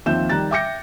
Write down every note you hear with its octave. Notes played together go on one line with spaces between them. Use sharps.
D#2 F3 C4 E5 G6 E7
D#3 G3 A#5 F#6 A6
E5 G5 D6 G6 A#6 C#7